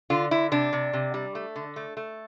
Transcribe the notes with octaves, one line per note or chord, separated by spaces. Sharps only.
D3 F4
D3 E4
C3 D4
C3
C3
G3
A3
D3
A3
A3